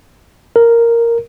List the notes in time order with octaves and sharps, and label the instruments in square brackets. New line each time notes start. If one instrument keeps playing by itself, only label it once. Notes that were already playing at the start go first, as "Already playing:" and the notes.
[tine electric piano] A#4